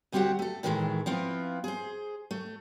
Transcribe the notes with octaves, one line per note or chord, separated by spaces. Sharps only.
D2 G3 C4 F#4 G4 F#5
A3 A4
A2 D#3 E3 F#3 G#3 A3
F3 B3 C4 E4 F4
G#4 C5
A3